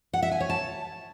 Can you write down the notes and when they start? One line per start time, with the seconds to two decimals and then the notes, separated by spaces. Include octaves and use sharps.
0.13 F#5
0.22 E5
0.31 G#5
0.40 C#5
0.49 A5